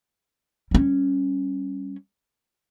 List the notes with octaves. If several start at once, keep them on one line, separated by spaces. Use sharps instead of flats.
G3 C#4